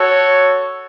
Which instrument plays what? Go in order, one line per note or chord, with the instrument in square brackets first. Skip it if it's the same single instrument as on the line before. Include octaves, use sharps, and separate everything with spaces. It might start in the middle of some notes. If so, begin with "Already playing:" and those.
Already playing: [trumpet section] F#4 A4 C#5